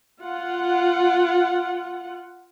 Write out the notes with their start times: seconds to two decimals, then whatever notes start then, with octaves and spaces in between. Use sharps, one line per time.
0.23 F4 F#5